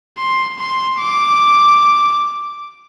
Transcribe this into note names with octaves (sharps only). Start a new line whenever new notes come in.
C6
C6
D6